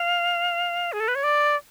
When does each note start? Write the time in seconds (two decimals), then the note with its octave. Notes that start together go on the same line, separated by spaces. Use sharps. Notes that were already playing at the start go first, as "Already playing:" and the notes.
Already playing: F5
0.93 G#4
1.00 A4
1.08 B4
1.15 C#5
1.23 D5